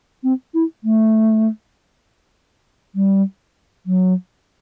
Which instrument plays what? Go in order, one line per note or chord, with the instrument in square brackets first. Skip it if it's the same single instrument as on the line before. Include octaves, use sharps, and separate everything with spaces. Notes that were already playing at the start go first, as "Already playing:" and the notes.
[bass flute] C4
E4
A3
G3
F#3